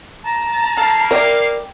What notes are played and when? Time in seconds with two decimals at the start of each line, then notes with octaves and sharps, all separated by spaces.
0.23 A5 A#5
0.77 A#3 A4 F5
1.11 E4 G4 A#4 D5